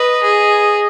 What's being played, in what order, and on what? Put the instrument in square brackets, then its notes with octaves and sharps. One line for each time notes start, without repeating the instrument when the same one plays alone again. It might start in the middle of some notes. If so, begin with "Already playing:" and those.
Already playing: [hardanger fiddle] B4 [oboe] D#5
[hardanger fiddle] G#4